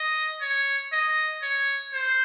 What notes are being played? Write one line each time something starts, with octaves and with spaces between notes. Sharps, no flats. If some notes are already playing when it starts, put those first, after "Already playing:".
Already playing: D#5
C#5
D#5
C#5
C5